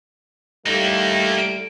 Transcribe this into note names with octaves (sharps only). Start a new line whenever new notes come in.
A2 G3 A3 A#3 D#4